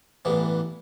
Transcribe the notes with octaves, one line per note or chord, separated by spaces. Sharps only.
A1 G2 E3 B3